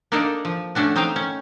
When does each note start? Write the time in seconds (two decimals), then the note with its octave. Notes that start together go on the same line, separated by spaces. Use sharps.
0.12 A#3 D4 D#4 A4 D5 D#5
0.45 F3
0.75 A3 C#4 D4 F#4
0.95 C4 D#4 D#5 F5 G5
1.16 C#4